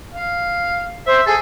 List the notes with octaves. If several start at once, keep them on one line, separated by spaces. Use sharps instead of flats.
F5
C5 E5
G#4 A4